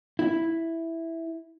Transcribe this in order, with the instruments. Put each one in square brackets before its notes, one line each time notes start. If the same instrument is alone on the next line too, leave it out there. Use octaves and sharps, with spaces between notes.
[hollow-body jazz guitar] E4